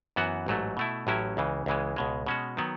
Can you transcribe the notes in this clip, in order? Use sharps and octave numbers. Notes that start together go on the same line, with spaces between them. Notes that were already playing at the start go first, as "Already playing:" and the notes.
F#2 E3 B3 F#4
A1 G#2 F#3 A3
B2 A3 E4
A1 A2 F#3 C#4 E4
C#2 C#3 E3
C#2 C#3 E3 G#3
C#2 B2 G#3
B2 G#3 C#4 F#4
D#3 F#3 B3